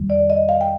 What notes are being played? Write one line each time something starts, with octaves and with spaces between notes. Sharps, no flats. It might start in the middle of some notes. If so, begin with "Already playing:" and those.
Already playing: F2 D#3 G3
D5
D#5
F5
G5